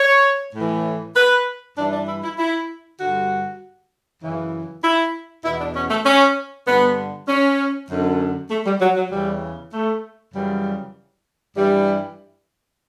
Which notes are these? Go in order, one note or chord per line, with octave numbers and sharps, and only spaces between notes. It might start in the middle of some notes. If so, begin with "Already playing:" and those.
Already playing: C#5
A2 E3
B4
G2 E3 D4
D4
E4
E4
E4
G2 D3 F#4
F#2 C#3 E3
E4
E2 B2 E4
D4
C#4
A3
C#4
G2 D3 B3
C#4
F#2 D3
A3
G3
F#3
F#3
E2 C#3 E3 G3
A3
F#2 C#3 E3 G3
G2 E3 G3